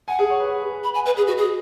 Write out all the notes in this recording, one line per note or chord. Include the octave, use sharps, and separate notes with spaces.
F#5 G#5
G#4
C#5
B4
B4
G#4
B4
B5
F#5 G#5
B4 D#5
G#4 B4
F#4 D#5
G#4